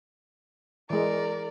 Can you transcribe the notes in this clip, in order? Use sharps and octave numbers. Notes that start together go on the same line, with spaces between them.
E3 G#3 A#4 D5